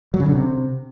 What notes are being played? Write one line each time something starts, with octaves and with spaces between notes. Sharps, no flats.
F#3
C#3
D3
C3